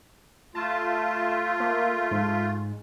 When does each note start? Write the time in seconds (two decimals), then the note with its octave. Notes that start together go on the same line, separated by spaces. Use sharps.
0.55 A3 F4 A5
1.60 A#3
2.11 G#2